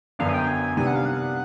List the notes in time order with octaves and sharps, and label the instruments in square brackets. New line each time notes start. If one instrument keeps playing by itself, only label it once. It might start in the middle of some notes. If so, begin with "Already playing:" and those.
[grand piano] F#2 D3 F#3 B3 D4 [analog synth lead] F5
[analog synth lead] G#5
G5
G#5
[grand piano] C3 D#3 G3 B3 D4 [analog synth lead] G#5
[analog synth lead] F#5
F5
F#5